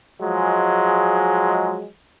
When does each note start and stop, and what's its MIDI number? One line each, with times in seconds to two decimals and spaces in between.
0.20 1.86 53
0.20 1.86 54
0.20 1.86 56